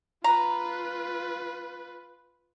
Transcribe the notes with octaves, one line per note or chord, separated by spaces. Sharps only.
F4 B4 A#5